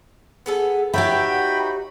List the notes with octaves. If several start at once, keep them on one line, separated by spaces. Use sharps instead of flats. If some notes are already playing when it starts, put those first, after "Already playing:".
B3 G#4 A4
B3 D#4 F#4 G4 C#5 E5 G5 B5